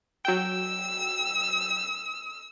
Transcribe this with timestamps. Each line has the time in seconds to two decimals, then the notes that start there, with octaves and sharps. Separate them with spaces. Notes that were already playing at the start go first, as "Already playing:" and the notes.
0.25 F#3 G5 E6